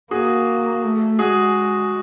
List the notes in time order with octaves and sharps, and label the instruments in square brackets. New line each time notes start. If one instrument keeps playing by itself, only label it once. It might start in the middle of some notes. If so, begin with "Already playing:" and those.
[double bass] A#3 [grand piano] F#4 G#4
[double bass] A3
[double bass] G#3 [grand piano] F#4 G#4